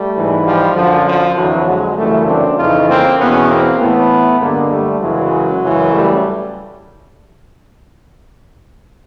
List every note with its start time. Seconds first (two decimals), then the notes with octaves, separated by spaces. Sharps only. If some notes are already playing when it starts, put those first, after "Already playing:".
Already playing: G3 A3
0.15 G#2 E3
0.45 F3 G3
0.76 F#2 D3 F3
1.06 F3
1.36 F2 D3 E3 F#3
1.67 F#3 G#3
1.97 F#2 C#3 E3 G3 A3
2.27 C4 D4
2.58 F2 C#3 E3 D#4 F4
2.88 A#3 C4
3.18 E2 B2 B3 C#4
3.48 A#3 C4
3.79 A2 E3 A3 B3
4.40 G2 D3 G#3 A#3
4.70 G3 A3
5.00 F#2 C#3 E3 F#3 G#3
5.62 F#2 C#3 E3
5.92 G3 A3